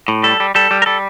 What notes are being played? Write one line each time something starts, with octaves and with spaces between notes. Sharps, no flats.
A2
G3 A4
G3
G3 A4
G3
A#4
G3 A4